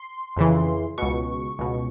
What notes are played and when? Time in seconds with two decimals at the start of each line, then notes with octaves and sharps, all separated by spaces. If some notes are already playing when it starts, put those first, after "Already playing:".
Already playing: C6
0.36 F2 C#3 E3
0.98 C#2 B2 C#6
1.59 C#2 B2